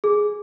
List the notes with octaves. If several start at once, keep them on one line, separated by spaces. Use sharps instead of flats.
G#4